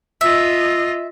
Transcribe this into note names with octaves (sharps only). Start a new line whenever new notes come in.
F4 D#5 E5